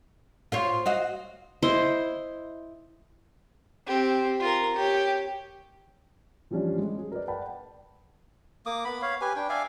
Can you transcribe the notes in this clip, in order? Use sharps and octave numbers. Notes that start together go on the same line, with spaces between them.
F4 C5 C#5
F#4 D#5 F5
E4 C5 D#5 C6
C4 G4
F4 A#4
G4 C#5
E3 F3 G3 C#4 D4
G#3
C#4 G#4
A#4 B4 D5
B4 D5 F#5 G5 A5 B5
A#3 D6 D#6
B3 B5
C#5 F5
G4 B4 G#5
D4 G5
D5 E5 F5 G#5